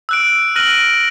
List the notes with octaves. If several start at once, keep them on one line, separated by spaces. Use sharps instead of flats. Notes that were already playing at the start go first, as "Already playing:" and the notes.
E6 F#6 D7
F6 F#6 A#6 D#7 F#7